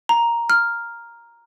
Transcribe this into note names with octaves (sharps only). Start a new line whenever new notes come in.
A#5
F6